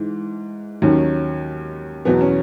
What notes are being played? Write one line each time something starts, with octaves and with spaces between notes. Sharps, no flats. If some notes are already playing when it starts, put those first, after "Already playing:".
Already playing: G#2 E3
D#2 D#3 F#3 C#4
E2 B2 F#3 B3
C#4